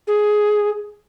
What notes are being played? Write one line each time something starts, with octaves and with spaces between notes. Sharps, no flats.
G#4